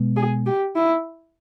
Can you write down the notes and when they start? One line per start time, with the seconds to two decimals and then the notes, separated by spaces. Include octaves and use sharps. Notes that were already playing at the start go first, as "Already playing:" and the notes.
Already playing: B2 G#3 B3
0.16 G#4
0.46 G4
0.75 E4